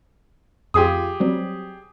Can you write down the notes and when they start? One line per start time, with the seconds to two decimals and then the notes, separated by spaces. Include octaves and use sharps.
0.74 F2 F4 G4 G#4 D#6
1.20 F#3 G3 C4